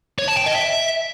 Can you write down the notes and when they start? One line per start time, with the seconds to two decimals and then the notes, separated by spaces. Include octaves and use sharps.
0.19 C#5
0.28 A5
0.37 G5
0.46 D#5
0.55 E5